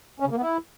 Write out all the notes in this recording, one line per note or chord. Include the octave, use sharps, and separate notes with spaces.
C#4
C#3
A#3
B3
E4